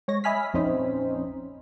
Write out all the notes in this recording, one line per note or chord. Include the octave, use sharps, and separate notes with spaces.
G#3 C#5 A#6
D#5 E5 G#5 B5 F6 B6
A#1 F2 C4 C#4 D#4 C5